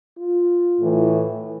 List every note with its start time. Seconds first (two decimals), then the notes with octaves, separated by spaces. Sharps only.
0.18 F4
0.81 A2 E3